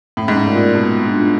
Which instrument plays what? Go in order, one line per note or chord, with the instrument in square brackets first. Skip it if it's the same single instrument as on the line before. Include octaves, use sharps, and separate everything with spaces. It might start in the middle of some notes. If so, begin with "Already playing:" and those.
[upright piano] A2 [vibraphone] C#4
[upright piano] G#2
A2
[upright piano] A2 [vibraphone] F4 A#4 D5
[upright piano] A#2
[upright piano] B2 [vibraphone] A3
[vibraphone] D4 F4 G#4